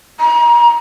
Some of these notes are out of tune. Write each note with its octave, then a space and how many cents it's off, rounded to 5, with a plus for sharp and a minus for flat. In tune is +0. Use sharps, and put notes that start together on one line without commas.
A#5 +35